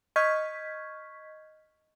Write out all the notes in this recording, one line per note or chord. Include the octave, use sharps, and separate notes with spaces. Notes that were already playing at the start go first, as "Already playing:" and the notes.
D#5 C#6 F6 G6 G#6 B6